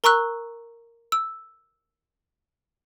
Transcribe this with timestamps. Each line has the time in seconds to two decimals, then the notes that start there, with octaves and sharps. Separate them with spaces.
0.04 A#4 A#5 C#6 E6 F#6
1.12 E6